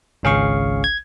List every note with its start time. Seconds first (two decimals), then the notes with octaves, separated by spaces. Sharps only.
0.23 G#1 C#2 C#4 G#4 F5 C#6
0.84 G#6